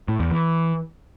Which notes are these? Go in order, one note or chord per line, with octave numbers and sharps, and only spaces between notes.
A2
E2
E3